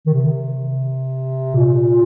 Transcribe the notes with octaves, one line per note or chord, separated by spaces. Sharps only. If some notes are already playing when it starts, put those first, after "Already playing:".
D#3
C3
A#2